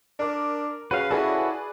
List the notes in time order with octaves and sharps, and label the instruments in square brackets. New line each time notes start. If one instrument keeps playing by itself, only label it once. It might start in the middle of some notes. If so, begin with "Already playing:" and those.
[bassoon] D4 [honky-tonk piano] A#4 D6
[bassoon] C#3 [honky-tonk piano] F#4 [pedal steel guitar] B4 F5
[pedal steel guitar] E4 F#4 A4 [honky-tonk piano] G#4 B4 D5